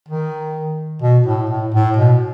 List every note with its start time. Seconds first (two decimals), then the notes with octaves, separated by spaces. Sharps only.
0.08 D#3
1.02 B2
1.26 A2
1.50 A2
1.74 A2
1.97 B2